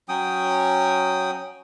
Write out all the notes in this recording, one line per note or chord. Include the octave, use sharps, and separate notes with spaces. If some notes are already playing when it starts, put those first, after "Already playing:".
F#3 C#4 G5 D#6